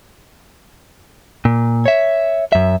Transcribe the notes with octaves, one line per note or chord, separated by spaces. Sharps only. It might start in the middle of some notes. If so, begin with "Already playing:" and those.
A#2
C#5 E5
F#2 E5